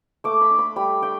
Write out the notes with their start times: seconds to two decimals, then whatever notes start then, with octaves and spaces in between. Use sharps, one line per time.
0.24 A3 D6
0.41 B5
0.51 D4
0.58 B5
0.76 G3 B5
1.02 D4 G5